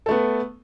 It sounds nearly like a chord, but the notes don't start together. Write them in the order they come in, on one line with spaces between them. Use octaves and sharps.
A4 A3 B3